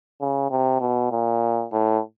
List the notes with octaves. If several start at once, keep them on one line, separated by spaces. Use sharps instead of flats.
C#3
C3
B2
A#2
A2